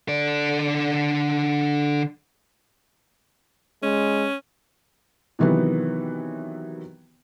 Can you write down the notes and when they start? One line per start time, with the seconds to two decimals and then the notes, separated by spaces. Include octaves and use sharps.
0.08 D3 D5
3.83 G#3 C#4
5.39 C3 D#3 E3 F#3 B3